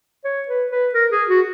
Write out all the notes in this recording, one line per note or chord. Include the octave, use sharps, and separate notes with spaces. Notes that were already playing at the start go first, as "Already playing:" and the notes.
C#5
B4
B4
A#4
G#4
F#4